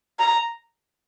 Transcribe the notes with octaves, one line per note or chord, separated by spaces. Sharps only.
A#5